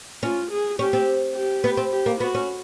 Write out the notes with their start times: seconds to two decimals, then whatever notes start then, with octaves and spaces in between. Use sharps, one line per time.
0.23 C#4 F4
0.51 G#4
0.79 C#4 G4
0.93 C4
1.35 G4
1.64 B3
1.77 C4
1.92 G4
2.06 A#3
2.20 B3 F#4
2.35 C#4